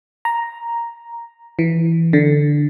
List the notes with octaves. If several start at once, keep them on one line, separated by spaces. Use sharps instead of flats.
A#5
E3
D3